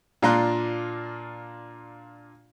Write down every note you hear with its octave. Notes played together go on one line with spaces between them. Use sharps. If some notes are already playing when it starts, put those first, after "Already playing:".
A#2 D4 F4 A#5 C6 F#6